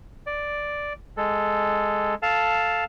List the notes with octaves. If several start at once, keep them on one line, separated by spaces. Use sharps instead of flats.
D5
G#3 A4
A4 F5 A5